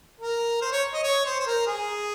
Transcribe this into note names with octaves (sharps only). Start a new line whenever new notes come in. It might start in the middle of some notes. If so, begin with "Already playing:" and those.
A#4
C5
C#5
D#5
C#5
C5
C5
A#4
G#4